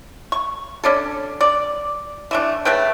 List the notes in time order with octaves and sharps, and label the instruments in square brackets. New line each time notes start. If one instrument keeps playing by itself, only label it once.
[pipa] C#6
C#4 D4 A4
D5
E3 A3 D4
C#3 A3 B4 G5